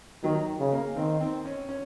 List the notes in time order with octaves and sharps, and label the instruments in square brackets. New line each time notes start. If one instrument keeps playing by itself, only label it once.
[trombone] D#3 [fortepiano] F#3
[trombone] C#3
[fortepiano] A#3
[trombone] D#3 [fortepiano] C4
[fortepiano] C4
C#4
C#4